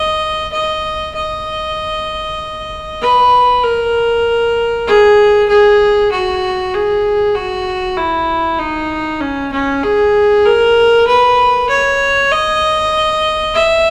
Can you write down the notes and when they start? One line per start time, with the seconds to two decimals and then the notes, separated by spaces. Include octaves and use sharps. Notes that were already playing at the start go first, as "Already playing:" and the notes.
Already playing: D#5
0.53 D#5
1.15 D#5
3.01 B4
3.63 A#4
4.87 G#4
5.49 G#4
6.11 F#4
6.74 G#4
7.35 F#4
7.97 E4
8.59 D#4
9.21 C#4
9.52 C#4
9.83 G#4
10.45 A#4
11.07 B4
11.69 C#5
12.31 D#5
13.55 E5